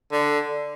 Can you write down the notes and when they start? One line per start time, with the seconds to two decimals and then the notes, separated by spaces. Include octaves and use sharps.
0.12 D3